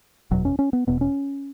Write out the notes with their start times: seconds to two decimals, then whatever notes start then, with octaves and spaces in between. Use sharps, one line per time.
0.31 F#1 E2 B2 F#3
0.45 C#4
0.59 C#4
0.73 B3
0.87 E1 E2 B2 B3
1.01 C#4